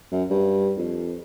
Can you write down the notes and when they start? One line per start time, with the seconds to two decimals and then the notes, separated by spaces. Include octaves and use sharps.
0.12 F#2
0.30 G2
0.78 F2